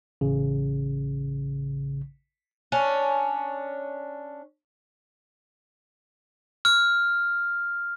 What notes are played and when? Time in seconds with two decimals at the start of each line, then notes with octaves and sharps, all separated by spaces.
0.21 A1 C#3
2.72 C#4 D4
6.65 F6